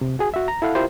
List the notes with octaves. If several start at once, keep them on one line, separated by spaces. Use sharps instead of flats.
C3
F#4 G#4 G#5
F#4 E5
A#5
E4 A4 F5 F#5
E4 F4 G4 A#4 C5